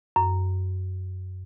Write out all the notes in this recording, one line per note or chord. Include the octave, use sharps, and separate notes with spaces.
F#2